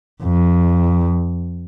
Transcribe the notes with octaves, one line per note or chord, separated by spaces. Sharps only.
F2